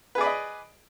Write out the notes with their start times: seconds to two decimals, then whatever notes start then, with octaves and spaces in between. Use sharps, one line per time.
0.15 B4
0.18 G#4
0.21 D5
0.24 B5
0.26 D#5